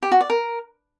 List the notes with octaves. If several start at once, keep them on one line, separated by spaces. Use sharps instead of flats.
G4
F#4
D5
A#4